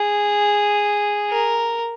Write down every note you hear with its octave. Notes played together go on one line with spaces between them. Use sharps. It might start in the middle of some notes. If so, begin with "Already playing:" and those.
Already playing: G#4
A#4